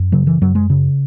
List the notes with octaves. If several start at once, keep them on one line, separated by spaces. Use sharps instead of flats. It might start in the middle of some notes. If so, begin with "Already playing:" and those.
Already playing: F#2
C#3 F#3
E3
F#2 F#3
G#3
C#3